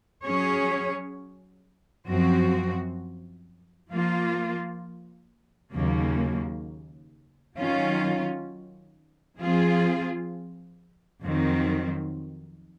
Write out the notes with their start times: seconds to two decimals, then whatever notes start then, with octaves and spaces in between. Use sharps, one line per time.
0.25 F#3 C#4 G#4 C#5
2.08 F#2 F3 C4 F#4
3.91 F3 A#3 F4
5.73 D#2 C#3 F#3 A#3
7.57 D#3 F#3 C#4 F4
9.39 F3 C4 F4 G#4
11.23 F2 D#3 F#3 C4